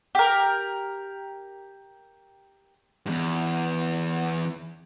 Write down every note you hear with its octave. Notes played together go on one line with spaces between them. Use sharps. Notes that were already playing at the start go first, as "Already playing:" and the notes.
G4 A#4
E2 G2